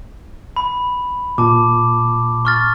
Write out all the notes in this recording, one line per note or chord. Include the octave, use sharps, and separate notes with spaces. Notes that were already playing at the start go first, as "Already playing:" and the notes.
B5
A#2 A5 D6
C#6 F6 A6